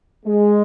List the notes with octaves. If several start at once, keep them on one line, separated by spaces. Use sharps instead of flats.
G#3